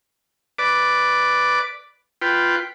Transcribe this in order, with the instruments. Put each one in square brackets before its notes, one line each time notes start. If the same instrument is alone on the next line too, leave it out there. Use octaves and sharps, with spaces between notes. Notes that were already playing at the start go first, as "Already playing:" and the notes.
[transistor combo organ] B4 D5 D6
F4 B4 G5